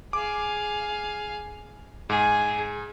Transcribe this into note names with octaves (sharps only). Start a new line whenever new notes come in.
G#4 F5 D6
G#2 G#4